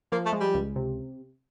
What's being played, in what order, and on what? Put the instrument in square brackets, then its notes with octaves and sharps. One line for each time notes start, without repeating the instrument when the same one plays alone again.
[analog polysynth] F3 [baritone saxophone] A#3
[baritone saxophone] A3
[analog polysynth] G#3
[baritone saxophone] G3
[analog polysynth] C#2
C3